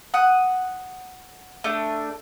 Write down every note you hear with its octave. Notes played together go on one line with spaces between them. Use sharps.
F#5 D#6
A3 D4